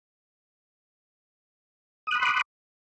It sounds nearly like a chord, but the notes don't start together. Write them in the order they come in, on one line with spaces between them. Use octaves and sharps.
D#6 F#6 B5 C6 D6